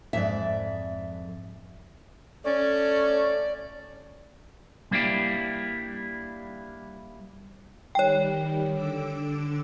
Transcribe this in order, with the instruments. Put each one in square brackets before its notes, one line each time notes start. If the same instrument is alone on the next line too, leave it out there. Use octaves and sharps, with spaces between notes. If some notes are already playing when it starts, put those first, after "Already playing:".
[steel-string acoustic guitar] F2 G#2 D5 [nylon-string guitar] E5
[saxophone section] A3 C#4 [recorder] D5
[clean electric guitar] G3 A#3 D4 E4 G4
[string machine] D#3 G3 [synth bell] C#5 G5
[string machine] D3 D6 E6